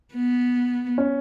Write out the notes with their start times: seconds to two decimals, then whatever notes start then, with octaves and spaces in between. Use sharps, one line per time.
0.14 B3
0.98 C#4